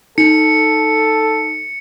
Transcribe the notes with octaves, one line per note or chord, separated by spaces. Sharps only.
D#4 A4 C#7